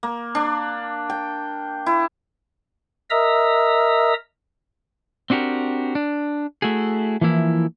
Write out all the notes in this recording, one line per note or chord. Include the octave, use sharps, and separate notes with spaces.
A#3
D4
G5
E4
A#4 D#5 E5 A#5 D#6 E6
C4 D4 F#4 G4 A#4
D4
A3 E4 F#4 G#4
E3 F3 A#3 E4